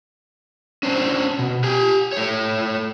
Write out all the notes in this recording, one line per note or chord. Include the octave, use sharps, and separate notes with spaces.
C#4 D4 C5
B2
G4 G#5
A3 C#5